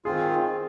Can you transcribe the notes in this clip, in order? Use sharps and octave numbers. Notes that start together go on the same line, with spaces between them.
D#3 C4 F4 G#4